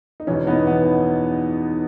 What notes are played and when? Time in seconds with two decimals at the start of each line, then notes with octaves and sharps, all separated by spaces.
0.20 D#4
0.27 E2 B2 C#4
0.47 B3 D#4
0.67 B3